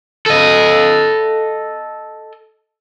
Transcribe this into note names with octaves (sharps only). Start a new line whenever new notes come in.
A4 D#5